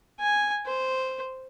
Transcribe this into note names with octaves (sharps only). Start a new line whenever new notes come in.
G#5
C5